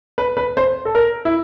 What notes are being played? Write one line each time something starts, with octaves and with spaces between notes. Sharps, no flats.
B4
B4
C5
A4
A#4
E4